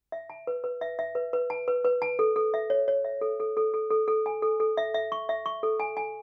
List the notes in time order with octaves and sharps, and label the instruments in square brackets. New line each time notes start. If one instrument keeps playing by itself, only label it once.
[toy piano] E5
A5
B4
B4
E5
E5
B4
B4
A5
B4
B4
A5
A4
A4
E5
C#5
C#5
E5
A4
A4
A4
A4
A4
A4
G#5
A4
A4
E5
E5
C#6
E5
C#6
A4
G#5
G#5